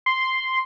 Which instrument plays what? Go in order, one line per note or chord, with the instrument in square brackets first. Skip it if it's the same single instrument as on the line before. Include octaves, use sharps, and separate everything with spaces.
[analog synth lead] C6